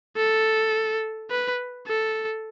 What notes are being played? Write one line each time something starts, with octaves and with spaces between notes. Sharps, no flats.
A4
B4
A4